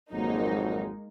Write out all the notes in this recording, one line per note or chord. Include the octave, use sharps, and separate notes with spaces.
G#1 F2 F#3 G#3 A#3 D#4